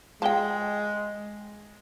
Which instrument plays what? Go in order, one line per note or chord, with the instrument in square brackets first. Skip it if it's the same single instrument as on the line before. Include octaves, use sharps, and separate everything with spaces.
[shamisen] F3 G5 [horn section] G#3